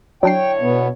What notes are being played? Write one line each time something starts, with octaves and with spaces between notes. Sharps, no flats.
D3 F#3 D4 E4 C#5 G5 C7
B2 B3